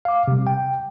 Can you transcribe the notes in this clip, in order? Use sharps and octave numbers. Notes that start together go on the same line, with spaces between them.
F5 D6
C3 G3
G5